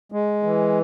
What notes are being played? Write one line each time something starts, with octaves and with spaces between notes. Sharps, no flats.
G#3
E3